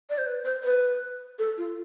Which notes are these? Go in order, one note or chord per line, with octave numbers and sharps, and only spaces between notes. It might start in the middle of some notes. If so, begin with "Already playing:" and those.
D5
C5
B4
C5
B4
A4
F4